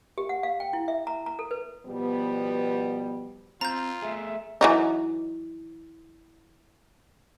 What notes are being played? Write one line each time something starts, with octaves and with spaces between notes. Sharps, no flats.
G4
F#5
F5
G5
E4
E5
A#5
A#5
A4
B4
B2 F3 G3 B3
C4 F4 A#5 G6
A3 G#4 E5
E3 F#3 D#4